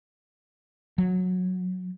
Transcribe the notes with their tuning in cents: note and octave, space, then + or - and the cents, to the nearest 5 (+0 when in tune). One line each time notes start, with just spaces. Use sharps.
F#3 -15